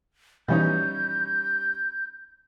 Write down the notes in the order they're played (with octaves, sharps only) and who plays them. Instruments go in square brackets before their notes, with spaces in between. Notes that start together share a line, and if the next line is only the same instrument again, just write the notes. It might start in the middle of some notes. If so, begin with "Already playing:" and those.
[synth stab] B2 E3 F3 [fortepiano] G3 C#4 D#4 [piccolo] G6